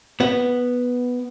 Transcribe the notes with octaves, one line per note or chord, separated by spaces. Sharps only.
B3